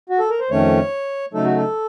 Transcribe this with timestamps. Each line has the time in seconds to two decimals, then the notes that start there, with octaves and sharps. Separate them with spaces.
0.09 F#4
0.19 A4
0.30 A#4
0.40 C5
0.50 F2 D#3 A3 C#4 C#5
1.33 C#3 F#3 A3 D#4 A4
1.45 F#4
1.56 A4